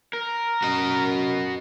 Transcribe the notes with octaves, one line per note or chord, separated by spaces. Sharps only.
A#4
F#2 F#4 D#5